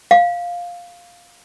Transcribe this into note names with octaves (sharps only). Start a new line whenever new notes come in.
F5